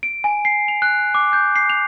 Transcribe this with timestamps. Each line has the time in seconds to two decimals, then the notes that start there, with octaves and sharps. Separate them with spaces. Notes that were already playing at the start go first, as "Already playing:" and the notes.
0.03 D7
0.24 G#5
0.45 C7
0.68 F7
0.82 F#6
1.15 D6
1.33 G6
1.56 C7
1.70 F7